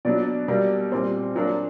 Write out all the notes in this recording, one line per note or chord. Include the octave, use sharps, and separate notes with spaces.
B2 F#3 B3 D4 D5
B2 G3 A#3
A#2 G3 C4 C5
A#2 F#3 A#3 D4